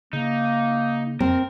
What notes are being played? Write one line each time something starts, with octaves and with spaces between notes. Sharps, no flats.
C#3 A#3 D#4
F2 C4 A#4